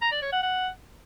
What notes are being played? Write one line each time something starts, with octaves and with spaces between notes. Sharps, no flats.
A#5
D5
C#5
F#5
F#5